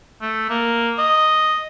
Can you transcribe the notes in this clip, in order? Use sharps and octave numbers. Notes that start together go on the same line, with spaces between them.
A3
A#3
D#5